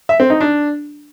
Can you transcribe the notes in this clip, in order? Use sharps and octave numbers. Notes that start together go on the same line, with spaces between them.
E5
C4
D#4
D4